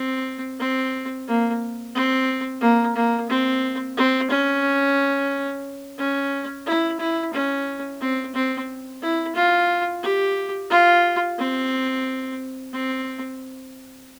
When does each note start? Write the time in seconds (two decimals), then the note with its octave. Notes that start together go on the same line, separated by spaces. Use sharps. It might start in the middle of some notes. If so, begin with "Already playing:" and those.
Already playing: C4
0.59 C4
1.27 A#3
1.95 C4
2.61 A#3
2.95 A#3
3.30 C4
3.97 C4
4.30 C#4
5.98 C#4
6.66 E4
7.00 E4
7.33 C#4
8.01 C4
8.35 C4
9.02 E4
9.35 F4
10.03 G4
10.70 F4
11.38 C4
12.73 C4